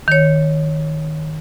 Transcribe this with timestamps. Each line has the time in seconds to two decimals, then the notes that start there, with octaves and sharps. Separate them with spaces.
0.08 D#3 C#5